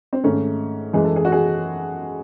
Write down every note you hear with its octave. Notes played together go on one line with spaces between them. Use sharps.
C4
G#2 D#3 A3 C#4
F#2 E3 G#3 G#4
A4
G#4
F#4
G#4